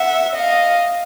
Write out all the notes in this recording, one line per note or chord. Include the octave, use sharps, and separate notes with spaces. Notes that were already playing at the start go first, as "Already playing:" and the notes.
Already playing: E5 F#5
D#5 F5